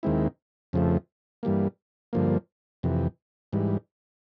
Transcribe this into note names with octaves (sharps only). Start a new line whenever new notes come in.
D#2 D#3 G#3 C4 E4
F2 C#3 F3 A3
G2 E3 G3 A#3
G2 D3 F3 A#3
F2 C3 E3
G#2 E3 G3